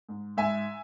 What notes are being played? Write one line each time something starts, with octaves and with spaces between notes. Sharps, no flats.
G#2
G#2 E5 G#5